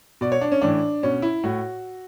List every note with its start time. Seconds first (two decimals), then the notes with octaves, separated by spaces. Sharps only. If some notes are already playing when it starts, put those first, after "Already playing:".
0.21 B2 D5
0.32 C#5
0.41 D4
0.52 C#4
0.62 A2 E3 D4
1.03 B2 C#4
1.22 E4
1.43 A2 F#4